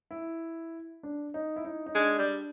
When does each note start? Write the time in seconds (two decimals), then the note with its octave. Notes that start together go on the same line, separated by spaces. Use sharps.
0.11 E4
1.03 D4
1.34 D#4
1.56 E4
1.65 D#4
1.86 D#4
1.95 G#3 D4
2.19 G3